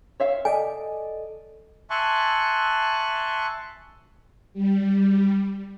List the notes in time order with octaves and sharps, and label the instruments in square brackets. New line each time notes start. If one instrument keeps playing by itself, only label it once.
[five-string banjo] C#5 E5 F5
[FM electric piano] A4 D5 D#5 [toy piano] G#5
[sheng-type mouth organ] E5 G#5 A5 C6 C#6 F#6
[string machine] G3